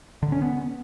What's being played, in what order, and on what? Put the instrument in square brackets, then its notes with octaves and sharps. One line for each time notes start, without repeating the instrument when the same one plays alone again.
[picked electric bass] D3
C#4
B3